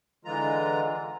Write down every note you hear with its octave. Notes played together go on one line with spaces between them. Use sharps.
D3 E3 G#3 F4 A#5